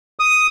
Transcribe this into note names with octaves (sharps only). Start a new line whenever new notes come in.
D#6